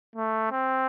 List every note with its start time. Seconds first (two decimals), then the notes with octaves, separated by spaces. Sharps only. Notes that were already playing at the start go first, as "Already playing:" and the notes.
0.16 A3
0.52 C4